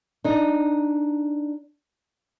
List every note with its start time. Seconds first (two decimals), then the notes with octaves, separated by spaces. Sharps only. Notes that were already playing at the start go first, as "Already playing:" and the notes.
0.24 D4 D#4